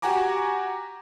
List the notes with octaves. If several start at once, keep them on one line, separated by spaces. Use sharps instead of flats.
F#4 G4 F#5 G#5 A#5 D6